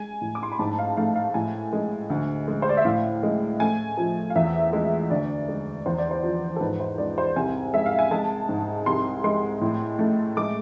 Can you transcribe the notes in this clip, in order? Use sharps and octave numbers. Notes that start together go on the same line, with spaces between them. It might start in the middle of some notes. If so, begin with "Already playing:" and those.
Already playing: G#3 G#5
A2
D6
C6
B5
G#2 A5
F5
A3 F5
F5
A2 G#5
G#3
D2
G#3
C5
D5
E5
A2 F5
G#3
A3 G#5
F3
F5
E2 E5
G#3
D2 D5
G#3
E2 C5
D5
C5
F3
A4
G#2 B4
C5
G#3 D5
C5
C2 G#5
G#3 E5
F5
G#5
G#3 A5
G#2
C2 C6
G#3 C6
A2
A3
G#3 D6